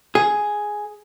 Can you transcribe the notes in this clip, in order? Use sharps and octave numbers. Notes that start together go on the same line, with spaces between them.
G#4